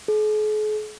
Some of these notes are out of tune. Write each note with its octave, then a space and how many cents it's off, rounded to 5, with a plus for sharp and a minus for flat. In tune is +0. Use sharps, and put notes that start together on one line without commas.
G#4 +45